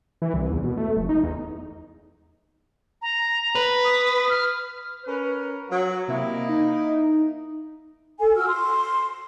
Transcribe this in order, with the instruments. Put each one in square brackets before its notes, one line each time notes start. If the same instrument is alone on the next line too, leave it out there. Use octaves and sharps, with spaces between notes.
[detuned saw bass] E3
C2
E2
B2
A3
F1
D#4
E2
[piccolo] A#5
[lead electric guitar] B4
[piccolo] D#6
F6
[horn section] C#4 A#4 B4
F#3
[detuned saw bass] C3 [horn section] A#3 E4 D#5
[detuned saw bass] D#4
[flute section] A4 G#5
F4 F#4 E6 F6
C6